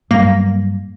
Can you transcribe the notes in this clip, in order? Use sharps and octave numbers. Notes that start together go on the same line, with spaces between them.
G2 F#3 G3 A#3 A#6